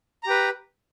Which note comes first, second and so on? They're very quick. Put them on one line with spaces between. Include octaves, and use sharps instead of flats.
A#5 G4 B4